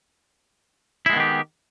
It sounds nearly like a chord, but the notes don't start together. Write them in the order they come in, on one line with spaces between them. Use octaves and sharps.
E4 G#3 B3 D#3 G4